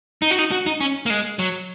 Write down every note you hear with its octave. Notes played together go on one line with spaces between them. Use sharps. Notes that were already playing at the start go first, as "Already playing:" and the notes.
D#4
F#4
D#4
F#4
D#4
C#4
A#3
G#3
F#3